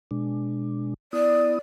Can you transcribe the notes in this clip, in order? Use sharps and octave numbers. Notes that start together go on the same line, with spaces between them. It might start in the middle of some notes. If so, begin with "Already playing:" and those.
B2 G#3 D4
B3 E4 D5 D#6